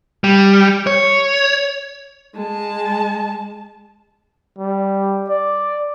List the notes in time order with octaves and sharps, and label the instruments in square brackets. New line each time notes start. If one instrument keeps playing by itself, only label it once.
[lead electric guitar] G3
C#5
[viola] G#3 A5
[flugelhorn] G3
D5